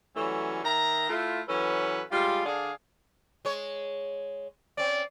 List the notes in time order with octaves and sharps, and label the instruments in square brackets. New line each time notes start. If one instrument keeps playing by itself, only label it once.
[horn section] E3 F#3 G3 A3 C#4
D#3 E5 A#5
A3 E4 F4
E3 F#3 C#4 A4 B4
G3 G#3 F4
D3 D4 G#4 D5 F5
[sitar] G#3 C#5
[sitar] C4 C#4 [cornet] D5